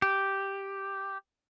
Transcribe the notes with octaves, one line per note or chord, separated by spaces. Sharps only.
G4